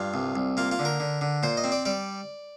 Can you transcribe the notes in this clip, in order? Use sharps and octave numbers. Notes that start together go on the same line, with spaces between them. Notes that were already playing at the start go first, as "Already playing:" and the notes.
Already playing: G2 F4
C2
C2
A#3 F4
F4
D3
A#4
D3
D3
A#2 C5
D#5
C4
D5
G3 D5